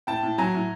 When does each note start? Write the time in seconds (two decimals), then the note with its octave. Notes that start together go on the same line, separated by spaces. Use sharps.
0.07 A2 G5 A5
0.23 A2
0.38 F#3 G#5 A#5
0.54 A2